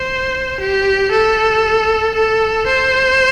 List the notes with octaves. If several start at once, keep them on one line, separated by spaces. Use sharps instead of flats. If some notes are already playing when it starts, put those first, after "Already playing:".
Already playing: C5
G4
A4
A4
C5